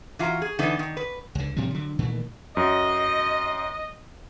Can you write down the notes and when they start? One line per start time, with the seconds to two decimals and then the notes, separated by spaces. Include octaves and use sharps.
0.19 E3 F4 F#4 A#5
0.42 G#4
0.59 D3 E3 B3 D4 D#4
0.79 D#3
0.97 B4
1.35 C#2 D3
1.56 A2 C3 F3 G3
1.74 D3 F#3
1.99 A#2 D#3 E3 A3
2.57 F#2 D#5